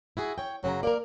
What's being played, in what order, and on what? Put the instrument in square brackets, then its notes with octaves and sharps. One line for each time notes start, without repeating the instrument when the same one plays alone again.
[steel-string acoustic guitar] E4 F#4 G#4
C#5 G5
[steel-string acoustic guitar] F#2 C#3 A#5 [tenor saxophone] F#3
[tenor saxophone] A#3 [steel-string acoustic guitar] A#4 D5